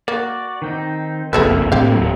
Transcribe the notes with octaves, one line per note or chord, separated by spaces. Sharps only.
A#3 F#4 D5
D#3 C4 D#4
F#1 B1 F2 A#3 G#4 A4 B4 E5
A2 D3 C4 G4 F5
D#1 F#3